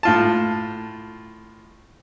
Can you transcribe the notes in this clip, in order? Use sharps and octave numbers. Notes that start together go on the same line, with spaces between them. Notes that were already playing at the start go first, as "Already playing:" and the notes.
A2 F4 A5